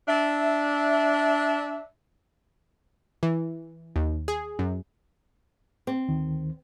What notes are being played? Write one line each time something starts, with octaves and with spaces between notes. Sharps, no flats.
D4 E5
E3
D#2
G#4
F#2
C4
D2 D#3